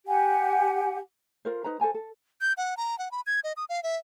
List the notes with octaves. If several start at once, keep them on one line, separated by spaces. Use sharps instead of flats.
G4 F#5 G#5
F4 A#4 C5
D#4 B4 C5 A#5
A4 C5 G#5 A#5
A4
G6
F#5
A#5
F#5
B5
G#6
D#5
D#6
F5
E5